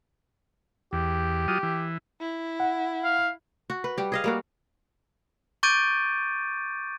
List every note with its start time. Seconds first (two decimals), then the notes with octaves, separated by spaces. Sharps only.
0.93 E2 G4
1.48 F#3 F4 D#6
1.63 E3
2.20 E4
2.60 F#5
3.04 F5
3.70 F#4
3.84 B4
3.98 G3 G4
4.12 G#4 D#5 F5
4.24 G3 A#3 F#4
5.63 C#6 D6 G6 A6 D7 D#7